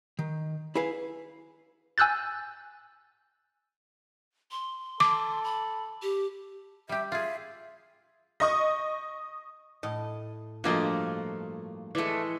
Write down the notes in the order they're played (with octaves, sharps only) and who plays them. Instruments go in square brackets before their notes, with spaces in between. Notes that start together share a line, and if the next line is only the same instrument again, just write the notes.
[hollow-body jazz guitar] D#3
E4 G#4 B4 F5
[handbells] G#5 E6 F#6 G6 A6
[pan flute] C6
[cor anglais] A4 [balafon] D6
[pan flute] B5
G4
[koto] G3 G4 [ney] E5
[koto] F4 G#4 [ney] E5
[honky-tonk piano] D#5 C#6 D#6
[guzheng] A2 [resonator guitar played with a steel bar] D#5
[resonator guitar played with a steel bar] G2 A#3 D#5 [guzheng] F3 [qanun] A3 F4 F#4
[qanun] E3 G#3 [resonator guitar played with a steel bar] A3 D5